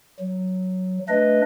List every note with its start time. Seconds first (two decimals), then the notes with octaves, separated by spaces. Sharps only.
0.19 F#3
1.08 A3 D4 B4 D#5